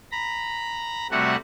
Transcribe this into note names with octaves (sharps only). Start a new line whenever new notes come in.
A#5 B5
C3 G3 A3 F#4 F#5